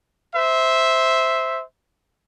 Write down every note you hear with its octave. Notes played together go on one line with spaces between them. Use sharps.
C5 E5